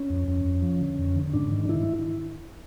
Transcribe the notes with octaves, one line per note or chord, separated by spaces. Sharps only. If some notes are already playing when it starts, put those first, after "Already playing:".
Already playing: C#4
F2
F2
F2
F3
D3
F2
D3
G#2 D4
D#3
D#3 E4